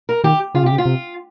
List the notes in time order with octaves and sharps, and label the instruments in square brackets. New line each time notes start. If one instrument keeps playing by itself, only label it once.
[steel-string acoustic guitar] A#4
[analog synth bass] D#3 [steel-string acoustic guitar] G4
[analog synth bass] C#3 [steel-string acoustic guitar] F4
[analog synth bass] C3 [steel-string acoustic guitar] G4
[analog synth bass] C#3
[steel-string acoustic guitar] F4
[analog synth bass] C3